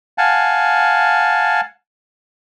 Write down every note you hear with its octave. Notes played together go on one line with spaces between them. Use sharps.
F5 F#5 G#5 A5